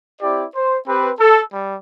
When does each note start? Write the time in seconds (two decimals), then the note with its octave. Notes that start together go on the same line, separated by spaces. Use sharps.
0.21 C4 E4 G4 D5
0.54 C5
0.86 C4 G4 B4
1.19 A4
1.52 G3